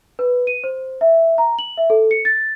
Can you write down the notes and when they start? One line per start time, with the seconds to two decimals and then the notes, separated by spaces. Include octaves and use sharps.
0.19 B4
0.47 D#7
0.64 C5
1.01 E5
1.38 A#5
1.59 F#7
1.77 E5
1.90 A4
2.11 C#7
2.25 A6